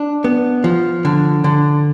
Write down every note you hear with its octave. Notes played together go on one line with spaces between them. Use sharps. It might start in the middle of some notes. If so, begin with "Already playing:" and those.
Already playing: D4
B3
F3
D3
D3